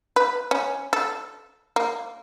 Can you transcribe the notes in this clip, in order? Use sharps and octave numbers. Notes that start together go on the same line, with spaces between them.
B4
C#4
A4
A#3